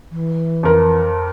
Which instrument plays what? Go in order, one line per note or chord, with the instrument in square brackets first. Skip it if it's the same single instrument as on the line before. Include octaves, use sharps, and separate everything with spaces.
[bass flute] E3
[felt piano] F2 A#4